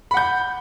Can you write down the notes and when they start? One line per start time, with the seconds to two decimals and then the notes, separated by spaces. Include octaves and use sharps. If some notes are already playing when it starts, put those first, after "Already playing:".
0.11 B5
0.14 F#5
0.17 G6